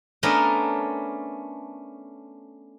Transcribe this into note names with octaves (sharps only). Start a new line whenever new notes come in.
A3 B3 C#4 D4 A#4 D#5